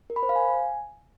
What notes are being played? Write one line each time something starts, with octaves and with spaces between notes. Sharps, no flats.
A#4
B5
C5
F5
G#5